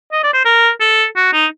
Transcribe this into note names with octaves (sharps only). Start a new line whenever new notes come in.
D#5
D5
C5
A#4
A4
F#4
D#4